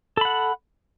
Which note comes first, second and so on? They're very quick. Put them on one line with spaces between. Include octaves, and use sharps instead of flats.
A4 B5 F#5